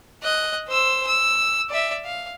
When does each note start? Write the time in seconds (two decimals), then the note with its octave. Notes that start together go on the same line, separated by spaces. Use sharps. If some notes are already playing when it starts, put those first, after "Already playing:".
0.23 D#5 F#6
0.69 C5 E6
1.07 E6
1.70 D5 E5
2.05 F5